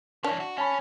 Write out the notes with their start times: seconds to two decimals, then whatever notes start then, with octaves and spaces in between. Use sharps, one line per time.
0.24 C#4 D4 E4
0.40 F#4
0.58 C#4 G#5 A5 B5